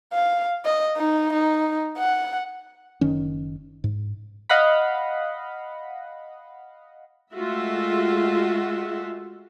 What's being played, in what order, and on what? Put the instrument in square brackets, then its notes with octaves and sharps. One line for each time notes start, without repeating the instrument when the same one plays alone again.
[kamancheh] F5
D#5
D#4
D#4
F#5
[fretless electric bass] F#1 D#3 C#4
G#2
[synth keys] D#5 F5 F#5 B5
[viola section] G#3 A3 F4 F#4 E5